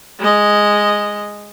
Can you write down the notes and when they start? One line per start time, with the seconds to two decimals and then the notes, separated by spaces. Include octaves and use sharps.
0.20 G#3 D#5